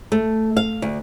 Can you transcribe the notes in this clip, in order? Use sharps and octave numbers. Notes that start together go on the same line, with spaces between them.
A3
F5
D2